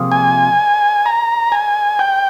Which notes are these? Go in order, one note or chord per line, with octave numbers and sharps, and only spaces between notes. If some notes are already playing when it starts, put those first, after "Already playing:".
Already playing: C3 F3 A#3 F4 G#4
G#5
A#5
G#5
G5